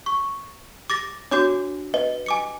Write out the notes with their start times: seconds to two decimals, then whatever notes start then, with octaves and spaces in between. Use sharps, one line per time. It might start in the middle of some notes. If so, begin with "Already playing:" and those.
0.06 C#6
0.90 D6 A6 A#6
1.31 D4 F#4 C#5 D6 G6
1.94 B4 D#5
2.26 G#5 D6 C#7